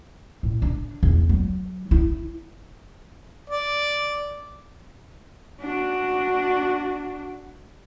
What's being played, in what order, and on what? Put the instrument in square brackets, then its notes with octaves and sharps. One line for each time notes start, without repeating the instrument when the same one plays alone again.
[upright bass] A2
D4
E2
F#3
E4
[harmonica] D5
[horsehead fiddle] D4 F#4